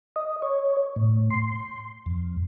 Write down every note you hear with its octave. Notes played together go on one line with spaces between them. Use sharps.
D#5
C#5
A2
C6
F2